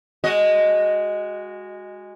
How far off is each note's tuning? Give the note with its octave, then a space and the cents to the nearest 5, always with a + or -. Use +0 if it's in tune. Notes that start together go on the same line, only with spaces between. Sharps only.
G#3 -15 F#4 +0 D#5 +0